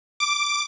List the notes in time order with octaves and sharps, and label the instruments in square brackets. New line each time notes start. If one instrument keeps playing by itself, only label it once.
[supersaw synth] D6